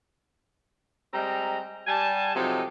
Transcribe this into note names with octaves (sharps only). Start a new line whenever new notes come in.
G3 G#3 C4 A#5
G3 G#5 A5
C3 F3 F#3 G#3 D#4 A4